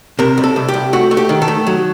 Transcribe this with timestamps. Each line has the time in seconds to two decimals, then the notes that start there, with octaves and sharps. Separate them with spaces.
0.19 C3 A#4
0.38 C2
0.44 A4
0.56 C2
0.69 G4
0.74 C2
0.93 A3 F#4
1.11 A3
1.17 G4
1.29 D#3
1.42 A4
1.48 A3
1.67 F#3